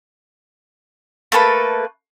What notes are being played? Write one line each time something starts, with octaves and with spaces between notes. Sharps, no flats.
A3 A#3 A4 B4